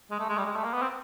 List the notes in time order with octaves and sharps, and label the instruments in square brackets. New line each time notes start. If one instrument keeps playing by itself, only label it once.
[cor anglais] G#3
A3
G#3
G3
G#3
A3
A#3
B3
C4